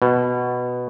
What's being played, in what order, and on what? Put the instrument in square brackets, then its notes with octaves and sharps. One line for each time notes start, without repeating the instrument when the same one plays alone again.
[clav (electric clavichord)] B2